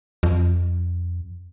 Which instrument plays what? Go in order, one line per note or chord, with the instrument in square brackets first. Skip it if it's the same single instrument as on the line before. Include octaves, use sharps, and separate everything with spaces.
[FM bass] F2